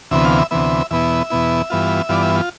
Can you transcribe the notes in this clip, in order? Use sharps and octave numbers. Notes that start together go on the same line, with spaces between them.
D2 C3 E3 B3 E5
F5
E5
D2 C3 E3 B3 E5
E2 B2 B3 E4 E5
E2 B2 B3 E4
G2 E3 B3 F4
G2 E3 B3 F4 D5
E5
F4